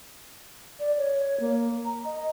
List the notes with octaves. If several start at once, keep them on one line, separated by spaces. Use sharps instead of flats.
D5
C#5
A#3
A#5
D#5